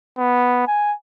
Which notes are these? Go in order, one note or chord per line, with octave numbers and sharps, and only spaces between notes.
B3
G#5